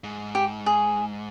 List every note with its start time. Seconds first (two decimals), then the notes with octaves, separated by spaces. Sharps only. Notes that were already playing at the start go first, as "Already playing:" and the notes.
0.04 G#2
0.35 G4
0.66 G#4